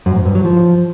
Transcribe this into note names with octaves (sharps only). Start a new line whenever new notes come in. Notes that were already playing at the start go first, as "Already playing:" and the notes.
F#2
G#2
G2
F#3
F3